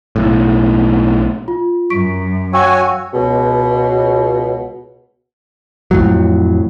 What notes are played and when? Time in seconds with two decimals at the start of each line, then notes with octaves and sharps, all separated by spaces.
0.16 B1 A2
1.48 F4
1.90 F#2 C#6 B6 D7
2.54 F#4 C#5 F5 G5 G#5 E6
3.14 C#2 B2
5.91 F2 A2 F#3